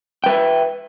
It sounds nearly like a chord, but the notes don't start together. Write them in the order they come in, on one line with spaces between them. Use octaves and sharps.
G5 B4 E5